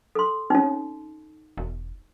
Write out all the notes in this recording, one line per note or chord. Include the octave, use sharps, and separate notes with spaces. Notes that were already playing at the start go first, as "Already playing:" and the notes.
A4 C6
C4 C#4 D#4
E1